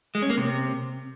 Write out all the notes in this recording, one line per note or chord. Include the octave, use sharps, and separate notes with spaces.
G#3
C#4
A#3
C3